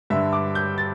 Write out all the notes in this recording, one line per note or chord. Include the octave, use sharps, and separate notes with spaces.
G2 D3 E5
D6
G6
A6